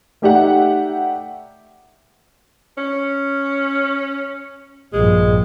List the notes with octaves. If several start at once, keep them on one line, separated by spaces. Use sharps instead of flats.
A3 D#4 G4 D5 E5 F#5
C#4
A#1 G2 G#3